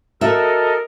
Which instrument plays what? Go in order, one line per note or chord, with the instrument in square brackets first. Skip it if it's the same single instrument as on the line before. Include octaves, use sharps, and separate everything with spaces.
[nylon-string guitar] F#4 E5 [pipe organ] A4 D#5 [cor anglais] A#4